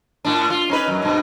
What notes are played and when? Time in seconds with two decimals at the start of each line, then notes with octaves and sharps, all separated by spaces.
0.25 A2 D4
0.50 F4
0.70 C#4 D#4 B4
0.88 F#2 F#3
1.03 G2 B2